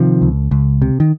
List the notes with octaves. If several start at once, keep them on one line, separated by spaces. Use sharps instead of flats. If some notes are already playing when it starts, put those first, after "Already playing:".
Already playing: C3 D#3 F3
C#2
C#2
C3
D#3